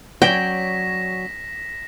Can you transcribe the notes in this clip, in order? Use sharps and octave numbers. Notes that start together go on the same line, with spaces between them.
F#3 C#4 D5 G5 A#6 B6 E7